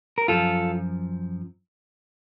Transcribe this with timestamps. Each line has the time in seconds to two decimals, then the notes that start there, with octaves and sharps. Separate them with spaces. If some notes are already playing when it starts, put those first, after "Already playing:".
0.18 A#4
0.28 F#2 F3 F4 A4